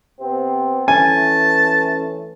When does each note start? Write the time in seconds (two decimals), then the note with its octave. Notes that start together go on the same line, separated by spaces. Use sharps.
0.21 C3 B3 C4
0.88 E3 A3 C#4 G#5 A5